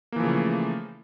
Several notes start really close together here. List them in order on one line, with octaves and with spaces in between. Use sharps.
A#3 E3 F3 C#3 A3